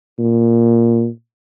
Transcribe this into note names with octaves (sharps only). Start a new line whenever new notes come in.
A#2